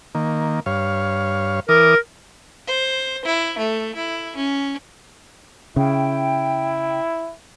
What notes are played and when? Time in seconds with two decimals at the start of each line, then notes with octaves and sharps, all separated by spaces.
0.15 D#3 A#3
0.66 G2 C#5 F5
1.69 E3 A#4 D6 D#6
2.68 C5
3.25 E4
3.58 A3
3.96 E4
4.36 C#4
5.76 C#3 E4 G5